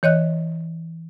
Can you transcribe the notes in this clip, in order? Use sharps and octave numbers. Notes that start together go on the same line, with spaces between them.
E3 C#5 D#5 F#6